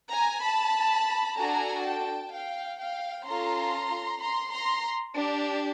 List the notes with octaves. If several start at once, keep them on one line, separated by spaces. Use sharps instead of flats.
G#5 A#5
A5 B5
D4 F#4 A4 G#5 A#5
G5 A5
F5 G5
F5 G5
C#4 F4 A4 A#5 C6
A#5 C6
A#5 C6
D4 G4